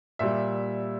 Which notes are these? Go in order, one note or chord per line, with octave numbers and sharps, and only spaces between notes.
A#2 G3 E5